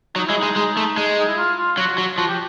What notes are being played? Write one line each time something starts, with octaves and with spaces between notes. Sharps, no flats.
F#3 D#4
G#3 E4
D#4
G#3
G#3
A3
G#3
D#4
E4
F4
F4
F#3 F#4
F#3
F3 F#4
G4